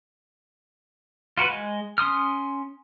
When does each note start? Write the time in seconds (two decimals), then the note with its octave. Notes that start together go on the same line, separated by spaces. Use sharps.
1.38 F4 F#4 A#4 B4
1.49 G#3
1.98 C#4 C6 D#6 F6